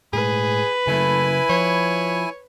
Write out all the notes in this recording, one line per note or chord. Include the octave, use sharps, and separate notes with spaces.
A2 G#3 A3 G#4 B4
C#3 F#3 A3 E4 G#5
F3 C#5